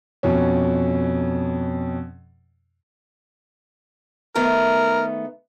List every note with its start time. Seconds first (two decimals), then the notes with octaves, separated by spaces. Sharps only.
0.23 F2 B2 C#4
4.35 D#3 A3 B3 A#4